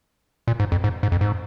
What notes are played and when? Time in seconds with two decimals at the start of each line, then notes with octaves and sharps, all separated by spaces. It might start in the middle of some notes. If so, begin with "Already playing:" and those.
0.48 A#2
0.60 G#2
0.72 F2
0.84 G#2
1.03 G#2
1.12 F2
1.21 G#2